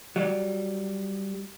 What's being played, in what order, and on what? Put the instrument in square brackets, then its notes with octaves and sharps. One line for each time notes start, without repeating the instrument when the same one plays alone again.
[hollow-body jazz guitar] F#3 G3